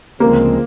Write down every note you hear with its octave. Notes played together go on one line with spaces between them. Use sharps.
D2 C#3 F3 G#3 A#3 C4